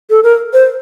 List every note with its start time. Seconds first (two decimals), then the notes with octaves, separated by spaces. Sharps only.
0.10 A4
0.23 A#4
0.53 C5